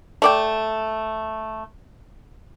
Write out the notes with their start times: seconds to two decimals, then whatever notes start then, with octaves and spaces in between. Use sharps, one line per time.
0.22 A3 D5 G5